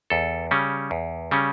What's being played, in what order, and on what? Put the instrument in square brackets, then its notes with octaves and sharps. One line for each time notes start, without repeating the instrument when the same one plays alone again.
[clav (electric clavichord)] E2 A4
C#3 G3 C#4
E2
C#3 G3 C#4